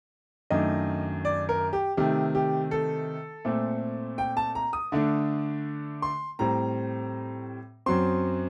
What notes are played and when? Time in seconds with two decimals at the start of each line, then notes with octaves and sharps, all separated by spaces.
0.50 F#2 D#3 A3 D4 D#5
1.25 D5
1.49 A#4
1.73 G4
1.97 C3 D#3 A3 G4
2.35 G4
2.71 A4
3.45 A#2 A3 C4
4.18 G5
4.37 A5
4.55 A#5
4.73 D#6
4.92 D3 A3 D4
6.02 C6
6.39 A2 G3 C4 A#5
7.86 F#2 F#3 C4 C6